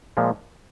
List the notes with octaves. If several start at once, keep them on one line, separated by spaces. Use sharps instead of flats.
A#2 F3 G#3